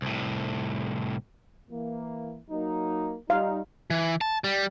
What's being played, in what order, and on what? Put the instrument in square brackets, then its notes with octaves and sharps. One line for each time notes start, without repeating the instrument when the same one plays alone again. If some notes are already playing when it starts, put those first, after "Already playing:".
[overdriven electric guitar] C2 A2
[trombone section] E3 A#3
F#3 A#3 D#4
[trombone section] G3 D#4 [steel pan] F5
[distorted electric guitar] E3
A5
G3